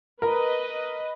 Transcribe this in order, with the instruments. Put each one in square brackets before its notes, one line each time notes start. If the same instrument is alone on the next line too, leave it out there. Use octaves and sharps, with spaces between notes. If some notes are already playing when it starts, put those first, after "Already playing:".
[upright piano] A#4 [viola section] B4 D#5